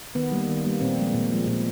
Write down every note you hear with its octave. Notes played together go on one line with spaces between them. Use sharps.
D#3 B3
G3 A#3
D#3
G3 A#3
A#2 C4
F3 G#3
A#2
F3 G#3
A#2